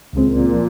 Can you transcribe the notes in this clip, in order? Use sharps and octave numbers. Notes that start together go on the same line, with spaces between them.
C#2 A#2 C#3 G#3 C4
F3